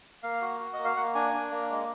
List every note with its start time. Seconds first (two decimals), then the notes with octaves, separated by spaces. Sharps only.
0.23 A#3 F5
0.42 F#4
0.60 F#4
0.73 D#5
0.79 A#3
0.85 F5
0.96 A#3 F#5
1.15 D4 G#5
1.34 D4
1.51 A#3
1.70 G#3